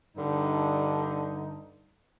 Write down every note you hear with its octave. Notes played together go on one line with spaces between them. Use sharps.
G2 D3 D#4